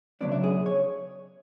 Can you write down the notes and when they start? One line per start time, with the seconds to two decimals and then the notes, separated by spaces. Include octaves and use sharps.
0.21 C#3 F#3 B3 D4 D5
0.32 E5
0.44 G#4
0.66 C#5